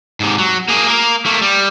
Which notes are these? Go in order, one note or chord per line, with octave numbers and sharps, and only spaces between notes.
G#2 C3
F#3
A#3 G#4
A#3 A#4
A3 A#3
G3